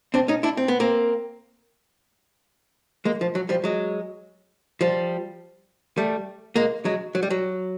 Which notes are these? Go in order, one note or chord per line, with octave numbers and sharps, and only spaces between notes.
C4 D4
C#4 D#4
D4 E4
C4
B3
A#3 C4
G#3 A#3
F3
F#3
F3 G3
F#3 G#3
F3 G3
G3 A3
G#3 A#3
F#3 G#3
F#3
G3
F#3